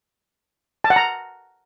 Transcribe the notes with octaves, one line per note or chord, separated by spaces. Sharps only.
A5
F#5
A#5